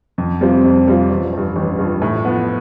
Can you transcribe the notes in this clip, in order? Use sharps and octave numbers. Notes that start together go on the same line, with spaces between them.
F2
C3 G3 C4 F4
F2
C3 G3 C4 F4
A1
G2 F3
A1
G2 F3
A2
F3 B3